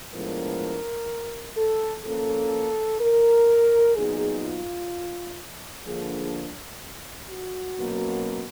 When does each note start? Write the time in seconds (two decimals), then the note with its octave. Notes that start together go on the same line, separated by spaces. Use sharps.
0.13 A2 F3 G#3 B3 D4 A#4
1.57 A4
2.04 F3 A#3 C#4 A4
3.00 A#4
3.95 A#2 F#3 B3 D#4 G#4
4.43 F4
5.86 D3 F3 A#3 D4 G#4
7.29 F#4
7.77 B2 F#3 A#3 C#4